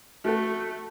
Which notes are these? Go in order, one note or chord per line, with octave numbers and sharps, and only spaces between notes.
A3 F#4 A4